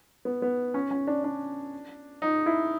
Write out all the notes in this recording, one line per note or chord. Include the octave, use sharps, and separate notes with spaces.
B3
B3
C#4
C#4
D4
D4
D#4
E4